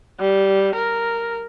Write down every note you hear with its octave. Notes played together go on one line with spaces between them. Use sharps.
G3
A#4